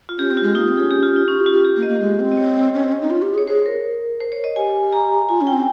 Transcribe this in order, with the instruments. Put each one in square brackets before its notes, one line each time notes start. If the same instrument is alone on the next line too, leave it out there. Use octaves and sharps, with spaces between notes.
[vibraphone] F4
[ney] C#4 [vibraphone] G4
[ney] C4
[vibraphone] F4
[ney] G#3
[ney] A#3 [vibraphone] D#4
[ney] C4
[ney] C#4 [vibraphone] G#4
[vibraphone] G4
F4
D#4
[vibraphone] C#4 [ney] F4
[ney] G4
[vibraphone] F4
[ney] G4
[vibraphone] G4
[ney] A#3
[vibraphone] D#5
[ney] A#3
G#3
C4
[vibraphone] D#5
C#5
[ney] C#4
C4
C#4
D#4
F4
G4
[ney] G#4 [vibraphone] C#5
[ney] G#4 [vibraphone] C5
[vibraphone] A#4
C5
C#5
D#5
[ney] G4 [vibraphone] G#5
[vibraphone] A#5
[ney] F4 [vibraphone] G#5
[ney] C#4
[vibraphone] G5
[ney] C4